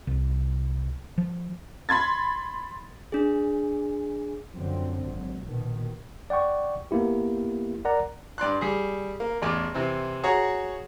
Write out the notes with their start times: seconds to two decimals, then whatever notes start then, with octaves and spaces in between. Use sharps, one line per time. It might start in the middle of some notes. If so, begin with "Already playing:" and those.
0.07 C2
1.18 F3
1.89 B5 C6 G#6 A6
3.12 D4 G#4
4.54 F#2 D3 F3 F#3 C4
5.04 G#1 F#3
5.42 A#1 B2 D#3
6.30 D5 F#5 G5 C#6
6.91 A#3 B3 E4 G4
7.85 A#4 D5 F#5 A#5
8.38 G2 D5 C6 F#6
8.61 G3 G#4
9.20 A#3
9.42 A1 E2 D6
9.74 C3 E3 C4
10.24 F#4 G#4 C#5 A#5